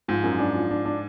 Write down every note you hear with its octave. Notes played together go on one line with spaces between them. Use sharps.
G#2 F3
F#2
D4
F3
D4
D4